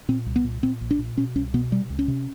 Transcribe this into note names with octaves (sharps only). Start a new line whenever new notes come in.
A#2 C4
C2
B3
A#2
A#2 C4
A#1
D4
A#2
B2 C#4
C2 C#4
B2 B3
C3 G3
C#2
C#4
C3